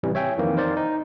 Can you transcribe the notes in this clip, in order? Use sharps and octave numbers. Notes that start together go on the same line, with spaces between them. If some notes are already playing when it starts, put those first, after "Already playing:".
A1 C3 E3 G3
C#5 E5 G5 G#5
F2 D#3 E3 A#3 C4
D#4 A#4 C5 D5
D#4